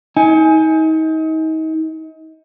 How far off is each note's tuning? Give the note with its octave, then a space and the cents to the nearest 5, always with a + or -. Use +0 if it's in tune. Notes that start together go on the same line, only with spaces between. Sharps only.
D#4 +35 G#5 +5